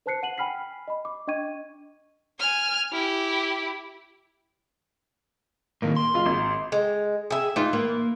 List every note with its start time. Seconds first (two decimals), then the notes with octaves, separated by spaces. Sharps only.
0.06 B4 C5 A5 F#6 C7 C#7
0.23 F#5 D#7 F#7
0.38 G5 G#5 B5 F6 B6 C7
0.88 D#5 B5
1.05 D6
1.27 D4 D#5 G5 C#6 G#6 D#7
2.40 G#5 F6
2.93 E4 G4
5.82 A2 D#3 A#3
5.96 C6
6.14 F#1 F4
6.26 G#1
6.72 G#3
7.30 G#4 E5
7.56 E3 D#4 F4
7.73 A#3